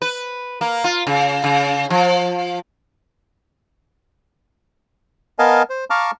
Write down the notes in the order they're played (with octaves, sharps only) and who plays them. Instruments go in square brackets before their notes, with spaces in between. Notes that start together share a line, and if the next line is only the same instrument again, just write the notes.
[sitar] B4
A#3
F4
C#3
C#3
F3
[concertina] B3 A#4 D#5 F5 G#5 A5
C5
F5 A5 A#5 C#6 D6 F6